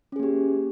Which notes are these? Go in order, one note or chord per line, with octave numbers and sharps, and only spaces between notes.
A#3 C#4 G4 G#4